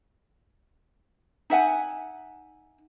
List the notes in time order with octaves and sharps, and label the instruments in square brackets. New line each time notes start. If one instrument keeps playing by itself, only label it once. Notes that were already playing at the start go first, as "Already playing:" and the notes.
[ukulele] D#4 E5 F#5 G#5